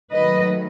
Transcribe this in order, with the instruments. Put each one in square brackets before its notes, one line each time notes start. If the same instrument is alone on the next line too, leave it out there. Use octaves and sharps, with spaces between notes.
[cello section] D#3 F#3 A3 B4 D#5